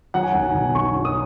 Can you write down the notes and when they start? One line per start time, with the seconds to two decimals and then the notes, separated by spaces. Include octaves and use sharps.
0.14 F#3 F#5
0.23 G#5
0.32 B1 F#5
0.45 G#5
0.54 B2
0.75 B1 C#6
0.95 F#3
1.05 D#6